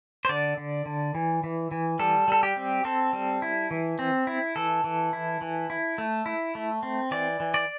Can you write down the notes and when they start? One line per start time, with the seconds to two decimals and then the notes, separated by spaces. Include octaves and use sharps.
0.25 C5
0.29 D3 D5
0.57 D3
0.86 D3
1.15 E3
1.44 E3
1.71 E3
1.99 G3 A4
2.28 G3 A4
2.43 G4
2.57 C4
2.85 C4 A4
3.13 G3
3.42 E4
3.71 E3
3.99 C4
4.27 E4
4.56 E3 A4
4.84 E3
5.13 E4
5.41 E3
5.70 E4
5.98 A3
6.26 E4
6.55 A3
6.83 C4
7.11 E3 D5
7.40 E3
7.54 D5